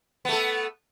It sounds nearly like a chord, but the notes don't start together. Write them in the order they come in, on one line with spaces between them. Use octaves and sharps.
B3 A3 A4